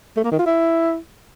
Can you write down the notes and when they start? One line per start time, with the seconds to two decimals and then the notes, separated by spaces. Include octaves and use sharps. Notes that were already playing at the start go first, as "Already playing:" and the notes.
0.17 A3
0.24 A#3
0.31 D#3
0.39 F4
0.46 E4